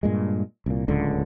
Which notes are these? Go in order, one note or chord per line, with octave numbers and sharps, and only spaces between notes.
G2 A#2 G#3
C2 A#2
D1 C#2 D3